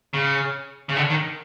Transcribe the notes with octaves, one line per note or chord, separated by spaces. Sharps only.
C#3
C#3
D3
D#3